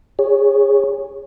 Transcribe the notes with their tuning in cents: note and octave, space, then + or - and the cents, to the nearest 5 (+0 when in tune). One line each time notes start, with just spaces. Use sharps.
G#4 -30 C#5 +0